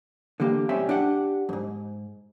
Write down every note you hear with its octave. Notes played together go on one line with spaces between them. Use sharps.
D3 E3 A#3 G4
B1 G3 C4 C#4 E5 G5
D4 G4 F#5
F2 G#2